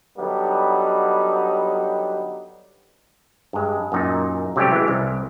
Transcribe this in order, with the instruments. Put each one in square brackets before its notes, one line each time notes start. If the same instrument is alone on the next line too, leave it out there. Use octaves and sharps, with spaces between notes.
[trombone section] D3 F#3 G3 B3 D#4
[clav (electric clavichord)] G2 G#3
F#2 A#2 D#4
C3 F#3 G3 A3 C#4 G4
E3 G#3
C2